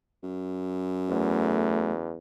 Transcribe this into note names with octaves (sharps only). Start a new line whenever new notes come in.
F#2
E2 A3